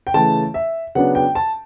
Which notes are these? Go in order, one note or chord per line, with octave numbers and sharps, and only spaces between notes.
G5
C#3 E3 A3 A5
E5
C#3 F#3 B3 D4 F#5
G5
A5